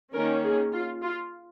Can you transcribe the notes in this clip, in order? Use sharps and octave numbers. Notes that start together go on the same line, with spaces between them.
D#3 A#3 C#4 A#4
G#4
F4
F4